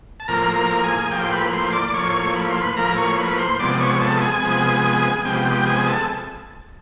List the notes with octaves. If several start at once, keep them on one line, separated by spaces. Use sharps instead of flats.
A5
A2 F3 A#3 A#4 A#5
A#4 A#5
G#4 G#5
G#5
A2 F3 A#3 G4 G5
C6
B4 B5
C5 C6
D5 D6
A2 F3 A#3 C#5 C#6
B5
C6
B4 B5
A2 F3 A#3 A#4 A#5
C#5 C#6
B4 B5
C5 C6
C3 F3 G#3 B3 D5 D6
C#5 C#6
A4 A5
A5
G#4 G#5
C3 F3 G#3 B3
C3 F3 G#3 B3 G4 G5
G4 G5
G#4 G#5
A4 A5